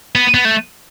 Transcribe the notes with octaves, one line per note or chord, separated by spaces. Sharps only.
B3
B3
A3